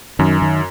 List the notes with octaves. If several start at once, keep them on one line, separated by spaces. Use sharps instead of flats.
F#2 D#3
D#3